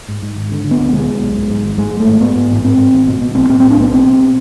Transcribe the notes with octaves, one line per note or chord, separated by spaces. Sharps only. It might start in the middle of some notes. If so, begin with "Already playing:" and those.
G#2
G#2
G#1
D3
D3
B3
D2
B2 G#3
B2
B1
G#2
G#2
G#1
G#2 G#3
G#2
A3
G#1
G#2 B3
G#2
A1
G#2 C4
G#2
G#1
B2
B2
B1 C4
A2 C4
A2 C4
D4
B1 B3
B2 C4
B2